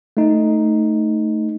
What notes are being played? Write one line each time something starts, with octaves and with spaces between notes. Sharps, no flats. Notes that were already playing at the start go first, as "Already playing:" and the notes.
A3 D#4